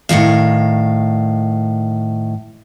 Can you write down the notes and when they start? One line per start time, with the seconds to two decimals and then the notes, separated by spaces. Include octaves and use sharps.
0.09 A2 D#3 F3 F5